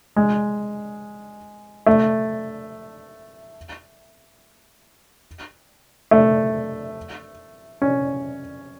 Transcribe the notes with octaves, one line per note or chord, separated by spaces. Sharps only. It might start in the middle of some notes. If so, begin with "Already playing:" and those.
G#3
A3
A3
C#4